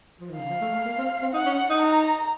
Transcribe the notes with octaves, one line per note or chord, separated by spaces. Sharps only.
F3
D#3
C#3 F5
F3
A3
A3
A#3
C4
C4
D#4 F#5
C#4
D#4
A#5